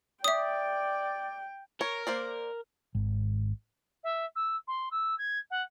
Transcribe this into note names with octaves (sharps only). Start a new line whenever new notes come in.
D5 E5 G5 D#6
A#4 C#5
A#3 C5 D5
G#1
E5
E6
C6
E6
G#6
F#5